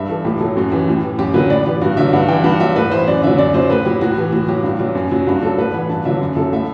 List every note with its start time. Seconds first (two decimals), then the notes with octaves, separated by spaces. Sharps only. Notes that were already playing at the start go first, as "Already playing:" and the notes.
Already playing: G2 E5
0.09 E3 A4
0.25 A2 G4
0.40 F#3 A4
0.56 F#2 F#4
0.72 E3 G4
0.88 A2
1.03 E3
1.19 F#2 G4
1.34 D3 F#3 B4
1.50 A2 D5
1.66 E3 G4
1.81 G2 F#4
1.97 D3 F#3 E5
2.13 G2 F#5
2.28 E3 G5
2.44 G2 F#5
2.60 F#3 E5
2.76 A2 B4
2.91 E3 C5
3.07 F#2 D5
3.22 D3 F#3 E5
3.38 F#2 D5
3.54 F#3 C5
3.69 A2 B4
3.85 F#3 G4
4.01 A2 F#4
4.17 E3 G4
4.33 A2 F#4
4.48 F#3 G4
4.63 G2
4.79 F#3
4.95 F#2
5.11 F#3
5.27 G2 F#4
5.42 F#3 A4
5.58 A2 B4
5.74 E3 F#5
5.89 G2 A5
6.05 D3 F#3 E5
6.21 F#2
6.36 F#3 A4
6.53 A2 E5